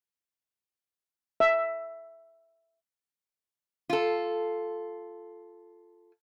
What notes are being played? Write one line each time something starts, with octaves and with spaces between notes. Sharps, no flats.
E5
F4 A4